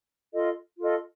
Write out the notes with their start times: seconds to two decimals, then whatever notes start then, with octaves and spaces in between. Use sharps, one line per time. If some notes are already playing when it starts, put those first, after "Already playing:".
0.33 F4 A4 D#5
0.79 F4 A4 D#5